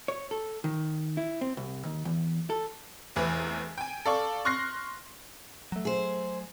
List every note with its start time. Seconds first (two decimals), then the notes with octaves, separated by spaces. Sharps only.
0.08 C#5
0.31 A4
0.64 D#3
1.17 E4
1.41 C4
1.57 C2
1.85 D#2
2.05 E2
2.50 A4
3.16 F1 E2 E3
3.78 G5 G#5
4.06 A4 D5 F5 C#6
4.45 C6 C#6 F6 F#6 A#6 C7
5.72 F#3 A3
5.85 G#4 C5